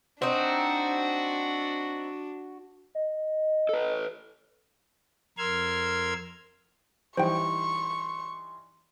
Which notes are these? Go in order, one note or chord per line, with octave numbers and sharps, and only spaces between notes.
C4 D4 D#4 F#4
D#5
A4 B4
F2 A#4 C6 E6 F6 G#6
E3 G3 D#4 C5 G5 C6 C#6